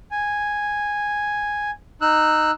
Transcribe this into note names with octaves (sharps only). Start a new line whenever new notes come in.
G#5
D#4 E6 F#6